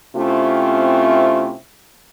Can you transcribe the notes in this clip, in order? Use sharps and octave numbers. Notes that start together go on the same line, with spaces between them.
C3 A3 C4 C#4 E4 F4